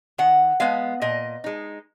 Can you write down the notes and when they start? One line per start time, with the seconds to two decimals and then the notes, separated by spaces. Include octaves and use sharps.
0.18 D#3 F#5
0.60 G#3 B3 F5
1.02 A#2 D#5
1.44 G#3 D#4